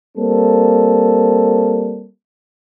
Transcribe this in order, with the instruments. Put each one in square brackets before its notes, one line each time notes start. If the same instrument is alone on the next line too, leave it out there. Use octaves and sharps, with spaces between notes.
[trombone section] G3 A#3 C4 A4